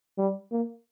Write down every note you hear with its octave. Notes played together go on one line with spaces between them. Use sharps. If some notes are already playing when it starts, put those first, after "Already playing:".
G3
A#3